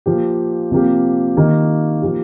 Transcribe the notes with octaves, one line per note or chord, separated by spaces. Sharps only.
F3 A#3 G4
C3 F3 A#3 G4
D#3 A#3 D#4 G4
F3 A#3 G4